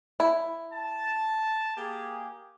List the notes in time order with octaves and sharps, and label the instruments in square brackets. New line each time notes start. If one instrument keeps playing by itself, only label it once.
[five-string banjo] E4
[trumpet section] A5
A#3 G4 G#4